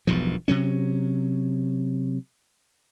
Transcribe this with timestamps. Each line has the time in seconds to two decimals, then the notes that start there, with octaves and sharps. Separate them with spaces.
0.07 E1 B1 G2 F3
0.48 C3 F#3 C#4